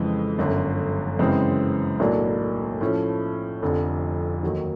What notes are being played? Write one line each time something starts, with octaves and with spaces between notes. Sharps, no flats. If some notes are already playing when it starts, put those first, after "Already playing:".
Already playing: F2 C#3 E3 G#3 C4
G1 F#2 D3
F#2 C#3 E3 G#3 C4
B1 A2 F#3 A#3 D4
A2 F3 A3 C#4
F1 F2 D3 F3
D#2 D#3 F#3